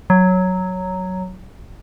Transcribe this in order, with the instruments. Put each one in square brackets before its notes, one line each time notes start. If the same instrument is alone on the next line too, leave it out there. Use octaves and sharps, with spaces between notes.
[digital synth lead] F#3